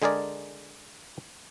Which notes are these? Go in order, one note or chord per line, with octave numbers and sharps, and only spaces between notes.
D3 G#3 G#4 A#4 D5